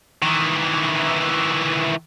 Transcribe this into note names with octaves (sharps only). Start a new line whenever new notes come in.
D#3 E3